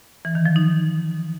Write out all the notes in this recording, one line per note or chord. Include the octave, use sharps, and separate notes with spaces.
E3
D#3
F3
D#4